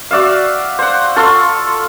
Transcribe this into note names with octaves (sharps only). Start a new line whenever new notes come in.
F#4 D5 E5 F5
C5 F#5
F4 A4 C6 C#6